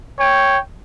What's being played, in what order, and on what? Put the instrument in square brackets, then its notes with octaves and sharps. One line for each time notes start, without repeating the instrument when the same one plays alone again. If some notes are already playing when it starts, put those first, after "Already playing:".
[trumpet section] C#5 G5